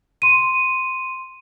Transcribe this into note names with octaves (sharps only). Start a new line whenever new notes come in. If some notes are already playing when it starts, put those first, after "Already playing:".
C6 D#7